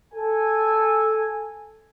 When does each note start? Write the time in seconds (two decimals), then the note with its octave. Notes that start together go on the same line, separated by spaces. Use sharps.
0.14 A4 G#5